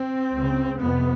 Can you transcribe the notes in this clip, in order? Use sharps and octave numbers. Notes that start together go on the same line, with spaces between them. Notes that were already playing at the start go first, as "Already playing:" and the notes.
Already playing: C4
C#2 C#3
F2 C3 B3